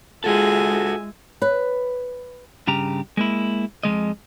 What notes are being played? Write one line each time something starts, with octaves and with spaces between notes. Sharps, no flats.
G#3 F4 F#4 G#4 A4 E5 G#5
B4 C#5
G2 C#3 G4 A#5
G#3 A#3 E4
F2 E3 G#3 D#5